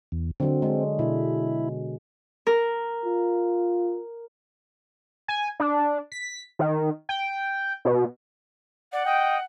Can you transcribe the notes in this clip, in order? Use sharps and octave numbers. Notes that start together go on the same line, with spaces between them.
E2
D3 F#3 C4
G#3
B2 E4
A#4
F4
G#5
D4
B6
D#3
G5
B2
D5 F#5
D#5 G5